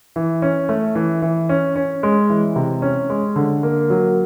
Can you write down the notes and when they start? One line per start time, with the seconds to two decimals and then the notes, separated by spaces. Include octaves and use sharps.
0.16 E3
0.42 C#4
0.69 A3
0.95 E3
1.22 E3
1.49 C#4
1.76 C#4
2.03 G#3
2.30 E3
2.56 C3
2.82 C#4
3.10 G#3
3.36 D3
3.63 A#3
3.90 F#3